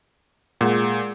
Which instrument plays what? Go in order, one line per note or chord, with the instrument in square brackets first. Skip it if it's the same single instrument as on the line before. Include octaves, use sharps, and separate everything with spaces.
[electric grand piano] A#2 [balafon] G#3 G#4 F#5